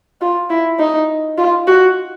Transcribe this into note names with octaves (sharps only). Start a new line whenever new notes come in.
F4
E4
D#4
F4
F#4